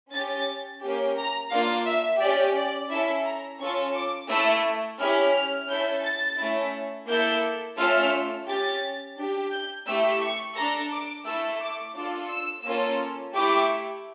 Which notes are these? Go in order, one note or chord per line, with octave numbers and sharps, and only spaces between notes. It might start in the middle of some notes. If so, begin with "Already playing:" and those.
C#4 G4 A6
A#3 C#4 G4
A#5
A#3 D4 F4 F5
E5
C#4 G4 D5
D5
C#4 E4 A4 E5
A#5
C#4 F4 A4 C#6
D6
A3 E4 A4 E6
C#4 E4 G4 F6
F6
C#4 E4 A4 G6
A6
A3 C#4 E4
A#3 E4 A4 G6
A3 C#4 F4 A4 F6
C#4 G4 A6
D4 G4
G6
A3 E4 G4 E6
C#6
D4 A4 A#5
D6
A3 E4 A4 E6
D6
D4 F4 A4
E6
A#3 C#4 F4 A4
A3 E4 G4 D6